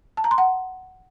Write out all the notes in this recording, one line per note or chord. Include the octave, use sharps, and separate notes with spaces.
A5
A#5
C6
F#5